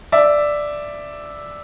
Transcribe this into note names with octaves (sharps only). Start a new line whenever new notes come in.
D5 E5